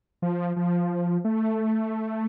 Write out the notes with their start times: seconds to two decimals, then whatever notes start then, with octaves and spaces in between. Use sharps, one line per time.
0.22 F3
0.56 F3
1.25 A3